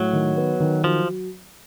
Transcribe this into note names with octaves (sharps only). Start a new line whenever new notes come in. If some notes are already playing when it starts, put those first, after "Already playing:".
Already playing: A2 F#3
D#3
B3
D#3
F3 F#3